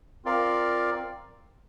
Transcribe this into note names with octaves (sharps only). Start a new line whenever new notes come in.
C4 F4 A#4 D5 F5